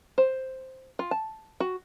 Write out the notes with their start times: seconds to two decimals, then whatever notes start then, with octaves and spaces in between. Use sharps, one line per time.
0.18 C5
0.99 F4
1.11 A5
1.60 F#4